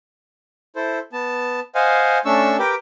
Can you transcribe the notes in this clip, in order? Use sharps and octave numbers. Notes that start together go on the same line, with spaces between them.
E4 A4 C5
B3 A5
C5 D#5 F5 F#5 G#5
A3 C#4 D4 C#6 E6
G4 A#4 B4 G5 D6